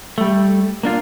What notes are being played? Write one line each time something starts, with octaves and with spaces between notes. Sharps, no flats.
G3 A3
A#3 D4 F4